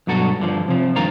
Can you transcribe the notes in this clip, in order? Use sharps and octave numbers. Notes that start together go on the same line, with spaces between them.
B1 G2 F#3 F#4 A4
G2 D3 F3
C3 F3
G2 D#3 A#3 F4 A#5